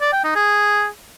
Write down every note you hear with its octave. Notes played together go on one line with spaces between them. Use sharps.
D5
G5
D#4
G#4